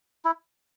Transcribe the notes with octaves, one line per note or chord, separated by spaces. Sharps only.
E4